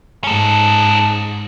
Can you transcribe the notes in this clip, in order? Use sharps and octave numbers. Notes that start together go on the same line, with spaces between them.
G#2 C#4 A4